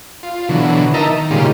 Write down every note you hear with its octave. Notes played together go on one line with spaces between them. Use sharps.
F4
B2 D3 E3 F#3
D#4 A#4 D#5 E5 A5 A#5
D#3
A#2 C#3 G3 G#3 D#4 F4